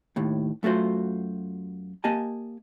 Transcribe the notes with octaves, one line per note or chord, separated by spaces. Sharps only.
D#2 A2
F#2 A3 F4 F#4 C5
A#3 G4 D#5 G#5 A5